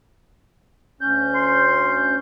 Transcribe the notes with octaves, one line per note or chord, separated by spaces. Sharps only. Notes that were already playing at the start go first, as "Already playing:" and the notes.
D2 C#4 G6
C6